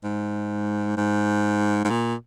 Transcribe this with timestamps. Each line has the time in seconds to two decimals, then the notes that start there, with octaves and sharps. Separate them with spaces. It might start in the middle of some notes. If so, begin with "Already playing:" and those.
0.04 G#2
0.97 G#2
1.85 G#2
1.90 A#2